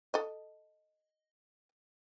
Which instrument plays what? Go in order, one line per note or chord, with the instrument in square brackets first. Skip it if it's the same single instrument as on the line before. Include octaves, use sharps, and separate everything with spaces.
[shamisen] A4 D#5